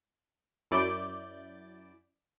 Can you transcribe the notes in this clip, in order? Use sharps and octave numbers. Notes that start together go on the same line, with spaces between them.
F#2 E4 D5 D6 G6